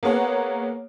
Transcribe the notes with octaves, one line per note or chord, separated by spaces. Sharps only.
A#3 B3 G#4 C#5 F#5